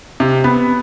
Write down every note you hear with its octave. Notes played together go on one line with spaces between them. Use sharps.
C3
B3